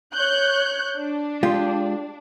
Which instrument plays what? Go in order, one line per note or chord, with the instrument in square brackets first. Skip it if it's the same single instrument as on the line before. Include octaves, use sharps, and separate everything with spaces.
[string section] C#5 F#6 G6
D4
[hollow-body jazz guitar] G#3 F4 G4